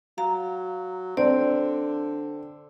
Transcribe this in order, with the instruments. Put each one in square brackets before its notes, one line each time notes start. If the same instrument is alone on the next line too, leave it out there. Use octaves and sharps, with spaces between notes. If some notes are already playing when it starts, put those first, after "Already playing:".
[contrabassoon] F#3 [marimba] F5 A#5
[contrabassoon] D3 [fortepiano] C4 [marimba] D5